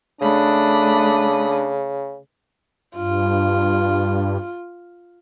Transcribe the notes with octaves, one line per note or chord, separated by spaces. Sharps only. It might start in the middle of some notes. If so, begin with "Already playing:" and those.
C#3 A3 D4 B5 D#6
G2 F4